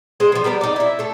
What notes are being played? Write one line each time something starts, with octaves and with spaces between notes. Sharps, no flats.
G#3 C5 D#5
E3 F3
G3 B3 A#4 D5
D#4 D5
E4 E5
A3 A4